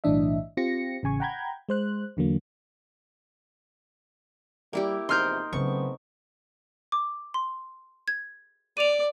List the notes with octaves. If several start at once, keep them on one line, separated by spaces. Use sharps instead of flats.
B1 A2 E3 D4 D#5 E5
C4 F4 G4 A#6 C#7
A1 C#3 G#5 C#6
F#5 G5 A#5 B5 G6 G#6
G#3 C5 F#6
E2 D3 F#3 A#3
G3 A#3 E4 G4
E2 C3 F3 D#4 A#4 C6 F6 G6
C#3 F#3 A3 B3 C4 C#6
D6
C6
G#6
D5 D#7 F7